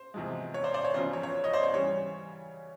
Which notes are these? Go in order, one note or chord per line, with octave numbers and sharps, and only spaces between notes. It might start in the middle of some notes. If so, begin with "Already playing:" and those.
Already playing: C5
E2 C3 F3 G#3
C#5
C5 D5
C5 D5
C#5
E1 E2 C#3 F3 C5
C#5
C#5
C#5 D#5
C5 D5
C#5
C#3 E3 G3 C#5